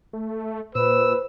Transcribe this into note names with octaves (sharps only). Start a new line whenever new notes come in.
A3
A#2 B4 C5 E6